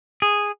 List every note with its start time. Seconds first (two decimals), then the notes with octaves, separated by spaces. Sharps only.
0.22 G#4